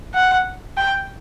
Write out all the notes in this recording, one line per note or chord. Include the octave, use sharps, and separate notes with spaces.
F#5
G5